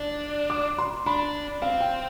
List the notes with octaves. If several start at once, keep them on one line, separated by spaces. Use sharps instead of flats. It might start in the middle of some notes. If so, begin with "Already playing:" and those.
Already playing: D4
D6
C6
D4 B5
C4 F5
G5